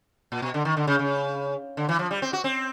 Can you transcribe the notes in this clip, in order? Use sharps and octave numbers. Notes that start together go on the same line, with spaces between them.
A#2
B2
D3
D#3
D3
C#3
C#3
D3
E3
F3
G3
C4
F#4
C4